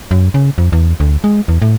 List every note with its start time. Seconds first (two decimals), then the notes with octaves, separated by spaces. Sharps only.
0.11 F#2
0.34 C#3
0.58 F2
0.72 E2
1.00 D2
1.24 G#3
1.48 E2
1.62 A2